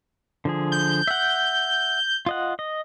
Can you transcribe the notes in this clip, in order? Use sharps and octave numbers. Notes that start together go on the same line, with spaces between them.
D3 F3 G#4
G6
E5 F#5
F4 D#5 F#5
D#5